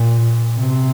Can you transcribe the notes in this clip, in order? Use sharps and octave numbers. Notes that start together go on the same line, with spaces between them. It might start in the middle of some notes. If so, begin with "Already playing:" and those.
Already playing: A#2
C3